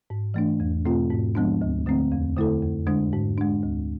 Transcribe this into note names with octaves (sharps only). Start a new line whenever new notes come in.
G#2
E3 A3 D4
E2
B2 A3 C4 F4
G#2
F3 G#3 B3 D4
D2
D3 A3 C4
E2
D3 A3 E4 A4
F2
D3 G#3 D4
G#2
G#3 D4
D2